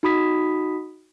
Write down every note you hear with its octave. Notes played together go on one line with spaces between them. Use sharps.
D#4 F#4 B5 D#6 B6